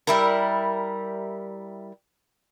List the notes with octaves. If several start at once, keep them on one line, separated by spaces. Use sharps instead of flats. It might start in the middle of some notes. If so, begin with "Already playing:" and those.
G3 E4 A#4